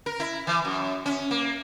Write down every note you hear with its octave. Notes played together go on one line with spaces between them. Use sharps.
A#4
E4
E3
F#2
C#4
A#3